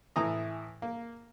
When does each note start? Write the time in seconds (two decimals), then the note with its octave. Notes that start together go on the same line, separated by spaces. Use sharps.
0.16 A2 E3 E4 G#5 A#5 D#6
0.82 A#3